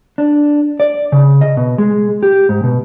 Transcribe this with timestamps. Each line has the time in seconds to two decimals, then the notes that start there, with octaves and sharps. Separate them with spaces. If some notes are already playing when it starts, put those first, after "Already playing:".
0.18 D4
0.80 D5
1.12 C#3
1.41 D#5
1.57 B2
1.78 G#3
2.23 G4
2.49 G#2
2.64 B2